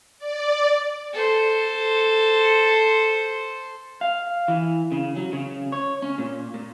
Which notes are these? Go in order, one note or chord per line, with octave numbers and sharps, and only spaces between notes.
D5
A4 C5
F5
E3
C#3
F#3
C#3
C#5
C#4
A#2
A#2